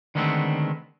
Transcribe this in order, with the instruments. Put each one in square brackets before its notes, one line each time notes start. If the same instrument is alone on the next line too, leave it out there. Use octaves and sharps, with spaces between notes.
[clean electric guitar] D3 D#3 G#3 A3 B3 C4